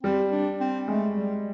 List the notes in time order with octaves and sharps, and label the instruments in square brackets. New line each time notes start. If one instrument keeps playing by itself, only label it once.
[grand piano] G3 [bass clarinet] C4
[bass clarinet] D4
C4
[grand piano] G#3 [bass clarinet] A3
[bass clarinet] G3